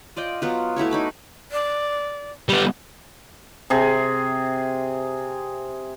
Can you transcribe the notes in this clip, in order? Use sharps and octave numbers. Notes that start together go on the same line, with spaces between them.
F4 D5 D#5 G5
F#3 B3 F4
A3 E4 F#4 C#5
D#4 B5 D6
D5
G3 B3
C3 G#4